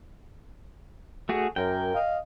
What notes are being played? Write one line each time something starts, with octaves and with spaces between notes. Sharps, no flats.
A3 F#4 G#4
F#2 A#4 G5
D#5 F5